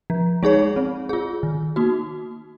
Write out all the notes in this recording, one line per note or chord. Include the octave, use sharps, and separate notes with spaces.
F3
G#3 D#4 G#4 C#5
C4
F4 G#4
D#3
A#3 D#4 F#4